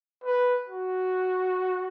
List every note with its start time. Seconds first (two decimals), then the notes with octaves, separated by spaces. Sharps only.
0.24 B4
0.68 F#4